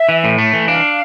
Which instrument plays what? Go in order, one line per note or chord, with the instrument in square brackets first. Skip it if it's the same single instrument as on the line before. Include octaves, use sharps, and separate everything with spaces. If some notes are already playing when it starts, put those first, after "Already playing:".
Already playing: [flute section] E5
[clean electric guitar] E3
A2
A3
E3
[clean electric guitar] D4 [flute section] F5